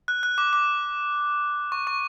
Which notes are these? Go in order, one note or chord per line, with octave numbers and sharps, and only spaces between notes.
F#6
F#6
D6
D6
C#6
C#6